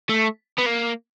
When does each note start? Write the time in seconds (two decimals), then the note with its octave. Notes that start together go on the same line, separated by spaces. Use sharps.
0.09 A3
0.59 B3
0.66 A#3